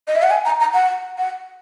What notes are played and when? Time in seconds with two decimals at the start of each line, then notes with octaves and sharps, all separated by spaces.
0.08 D#5
0.16 E5
0.23 F#5
0.30 G#5
0.45 A#5
0.60 A#5
0.74 F#5
1.18 F#5